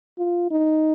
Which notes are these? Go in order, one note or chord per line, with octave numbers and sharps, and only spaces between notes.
F4
D#4